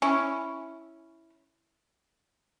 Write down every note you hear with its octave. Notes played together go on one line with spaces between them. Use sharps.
C#4 E4